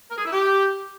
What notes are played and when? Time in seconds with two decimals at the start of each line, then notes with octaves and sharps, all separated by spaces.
0.10 A#4
0.17 G#4
0.25 E4
0.33 G4